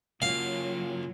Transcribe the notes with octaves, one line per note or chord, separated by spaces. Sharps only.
C#3 F#3 A#3 F4 F5